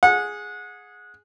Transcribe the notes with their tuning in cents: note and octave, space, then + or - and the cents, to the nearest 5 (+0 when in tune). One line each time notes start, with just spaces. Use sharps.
G#4 +0 F#5 -25